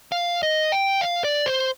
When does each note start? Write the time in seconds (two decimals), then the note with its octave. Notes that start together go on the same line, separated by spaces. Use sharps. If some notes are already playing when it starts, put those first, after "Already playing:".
0.12 F5
0.43 D#5
0.72 G5
1.01 F5
1.24 D5
1.46 C5